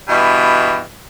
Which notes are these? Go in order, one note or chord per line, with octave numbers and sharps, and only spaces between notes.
G2 B2 E3